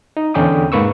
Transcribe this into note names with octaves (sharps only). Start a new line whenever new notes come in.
D#4
E2 D3 C#4 G5 D6 D#6
G#2 A#3 B4 C#6 E6